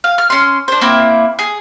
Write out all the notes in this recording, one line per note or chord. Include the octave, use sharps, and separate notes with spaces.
F5
F6
C#4 C6
D4 C5
A#3 C4 E4
G#4